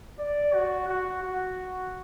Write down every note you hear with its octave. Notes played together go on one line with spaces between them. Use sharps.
D5
F#4
F#4
F#4